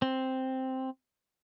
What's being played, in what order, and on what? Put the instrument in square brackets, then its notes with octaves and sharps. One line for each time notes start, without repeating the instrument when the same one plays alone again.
[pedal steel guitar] C4